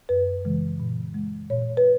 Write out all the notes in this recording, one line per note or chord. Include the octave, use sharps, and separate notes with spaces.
F#2 B4
C#3 E3 G#3
A#2
G#3
A#2 C#5
B4